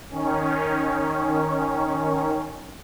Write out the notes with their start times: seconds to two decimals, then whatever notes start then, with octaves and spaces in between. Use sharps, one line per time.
0.10 D#3 C#4